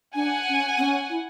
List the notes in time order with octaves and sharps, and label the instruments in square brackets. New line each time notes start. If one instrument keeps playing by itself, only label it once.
[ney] D4 [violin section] F#5 G#5
[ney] C#4
C4
C#4
E4